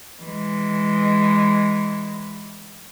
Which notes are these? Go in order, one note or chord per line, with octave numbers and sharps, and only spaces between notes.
E3 G#3